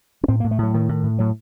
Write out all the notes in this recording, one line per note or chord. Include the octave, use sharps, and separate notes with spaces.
C#4
A2 C4
A#3
A2
A3
A2 F#3
A2 D#3
A2
A2
A2 F#3